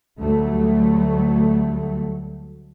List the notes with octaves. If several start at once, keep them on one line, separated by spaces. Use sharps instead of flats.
D2 F#3 G3 A3